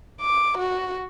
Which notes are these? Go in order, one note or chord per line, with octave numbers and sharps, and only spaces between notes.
D6
F#4